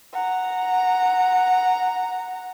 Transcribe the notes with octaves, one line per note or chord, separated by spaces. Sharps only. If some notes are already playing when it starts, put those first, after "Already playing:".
F#5 A#5